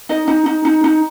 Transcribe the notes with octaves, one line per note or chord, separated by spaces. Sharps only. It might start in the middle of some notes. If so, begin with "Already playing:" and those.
D#4 D#5
D#4
D#4
D#4
D#4